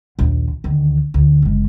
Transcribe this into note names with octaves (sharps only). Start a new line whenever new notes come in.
A#1 D#2
D2 D#3
D2
F#1 G#3